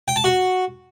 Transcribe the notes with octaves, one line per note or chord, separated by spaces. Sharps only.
G5
A5
F#4